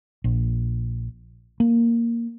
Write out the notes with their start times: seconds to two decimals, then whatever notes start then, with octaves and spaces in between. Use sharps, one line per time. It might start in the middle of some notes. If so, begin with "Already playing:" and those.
0.24 A#1
1.60 A#3